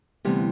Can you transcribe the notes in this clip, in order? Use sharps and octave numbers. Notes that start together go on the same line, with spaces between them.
D2 C3 E3 G3 B3